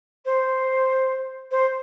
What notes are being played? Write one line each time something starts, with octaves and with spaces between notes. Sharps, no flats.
C5
C5